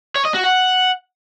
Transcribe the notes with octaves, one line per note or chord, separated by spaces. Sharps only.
C#5
D#5
F#4
F#5